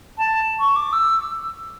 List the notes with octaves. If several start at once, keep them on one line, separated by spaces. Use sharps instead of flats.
A5
C#6
D6
E6